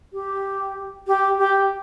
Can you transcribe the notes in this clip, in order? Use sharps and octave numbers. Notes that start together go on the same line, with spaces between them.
G4
G4
G4